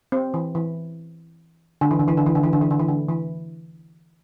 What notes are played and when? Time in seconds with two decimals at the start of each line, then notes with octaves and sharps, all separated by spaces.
0.12 C4
0.34 E3
0.55 E3
1.81 D3
1.91 E3
1.99 D3
2.08 E3
2.17 D3
2.26 E3
2.35 D3
2.43 E3
2.53 D3
2.61 E3
2.71 D3
2.79 E3
2.88 D3
3.09 E3